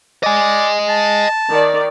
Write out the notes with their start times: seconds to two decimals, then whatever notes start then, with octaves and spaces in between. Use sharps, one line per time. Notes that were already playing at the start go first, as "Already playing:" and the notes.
0.23 D5 D#5 G#5
0.89 A5
1.49 D#3 D5